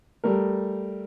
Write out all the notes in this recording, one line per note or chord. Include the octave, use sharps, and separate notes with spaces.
G3 A3 A#4